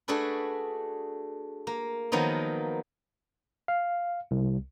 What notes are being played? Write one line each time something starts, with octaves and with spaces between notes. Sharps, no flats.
A3 D4 F#4 G#4 A4 B4
A#3
D#3 F3 F#3 A#3 B3 D#4
F5
C2